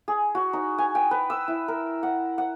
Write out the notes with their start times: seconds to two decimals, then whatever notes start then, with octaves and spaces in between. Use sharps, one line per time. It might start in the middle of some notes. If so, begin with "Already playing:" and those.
0.08 G#4
0.35 F#4
0.53 D#4
0.78 G#5
0.95 G5
1.11 B4
1.30 E6
1.48 E4
1.68 A#4
2.03 F#5
2.38 F#5